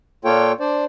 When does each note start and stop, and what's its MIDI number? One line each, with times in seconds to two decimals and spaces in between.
0.25 0.52 46
0.25 0.52 58
0.25 0.52 65
0.25 0.52 69
0.25 0.52 73
0.25 0.52 79
0.60 0.85 62
0.60 0.85 72
0.60 0.85 74